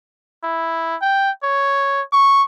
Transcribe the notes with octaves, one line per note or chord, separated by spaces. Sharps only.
E4
G5
C#5
C#6